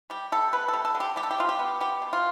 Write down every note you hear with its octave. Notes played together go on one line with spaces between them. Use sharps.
G3 G4
G3 A4
B3 B4
A4
G3
A4
D3
G4
G3 G4
A4
G4
G3 F4
G4
B3
B3 G4
B2
F4